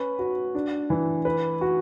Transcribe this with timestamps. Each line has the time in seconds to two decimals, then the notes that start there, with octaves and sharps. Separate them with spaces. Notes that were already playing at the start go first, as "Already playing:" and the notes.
Already playing: C#4 B4
0.19 F#4
0.55 D4
0.90 E3
1.25 B4
1.61 F#4